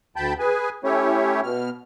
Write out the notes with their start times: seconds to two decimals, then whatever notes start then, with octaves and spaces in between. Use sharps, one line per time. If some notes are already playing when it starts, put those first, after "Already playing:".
0.16 D2 G5 A5 B5 G6
0.39 G#4 B4 G#5
0.84 A3 C#4 E4 G4 C#5
1.43 B2 F6